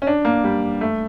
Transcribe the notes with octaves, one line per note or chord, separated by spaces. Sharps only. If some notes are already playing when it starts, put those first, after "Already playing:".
C#4
D4
A#3
G3
A3